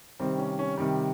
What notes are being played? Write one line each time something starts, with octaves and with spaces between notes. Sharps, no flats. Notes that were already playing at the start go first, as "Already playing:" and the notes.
C3 D#3 G3 C4
C#4
C#4
C3 D#3 G3